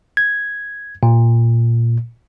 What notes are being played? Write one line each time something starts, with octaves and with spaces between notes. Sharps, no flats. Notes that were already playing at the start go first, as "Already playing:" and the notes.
G#6
A#2